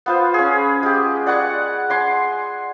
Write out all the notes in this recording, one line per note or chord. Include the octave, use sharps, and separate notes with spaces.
B3 F4 C5
C#4 G#4
G#3 G4
D5 F#5 G#5 C#6
G#5 C6 D6